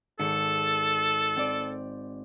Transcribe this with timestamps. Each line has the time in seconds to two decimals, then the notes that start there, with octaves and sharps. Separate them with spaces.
0.19 G#1 A4 C#7
1.37 C4 D5